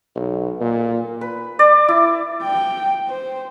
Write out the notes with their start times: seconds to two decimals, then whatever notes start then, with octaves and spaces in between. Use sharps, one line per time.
0.16 B1
0.61 A#2
1.21 B4
1.59 D5
1.88 E4
2.43 G5
3.08 C5